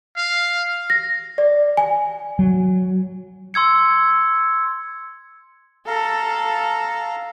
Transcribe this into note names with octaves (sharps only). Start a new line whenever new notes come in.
F5
A#6
D5
G#5
F#3
C6 E6 G#6 C#7
A4 F5 A#5